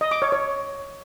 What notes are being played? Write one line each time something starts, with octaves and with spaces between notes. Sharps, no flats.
D#5
D6
C#5
C#5